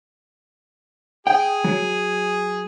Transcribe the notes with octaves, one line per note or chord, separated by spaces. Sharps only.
G#4 G5
F#3